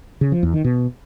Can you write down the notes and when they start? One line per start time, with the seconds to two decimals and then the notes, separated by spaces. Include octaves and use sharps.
0.21 C#3
0.32 F3
0.43 E2
0.54 D#3
0.64 B2